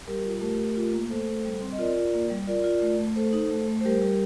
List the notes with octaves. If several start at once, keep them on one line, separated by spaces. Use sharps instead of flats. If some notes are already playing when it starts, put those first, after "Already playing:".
G3 G4 A#4
F4
A3 G4 A#4
A3
F4
A#3
A3 A4 C5
A3
G3
C4
D#5
F4 A#4 D5
F4
A#3
G3
F4 A#4 D5
F4
A3
A3
A3 A4 C5
D#4
A3
A3
C5
G3 G4 A#4
G3